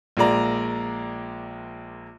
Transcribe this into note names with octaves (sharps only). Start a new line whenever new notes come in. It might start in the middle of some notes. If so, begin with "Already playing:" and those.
A#1 G#3 A#3 D5 A#5